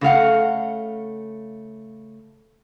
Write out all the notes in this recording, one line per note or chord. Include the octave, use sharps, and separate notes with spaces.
C#3 A3 F5 F#5